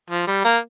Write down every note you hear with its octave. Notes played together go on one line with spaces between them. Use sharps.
F3
G3
A#3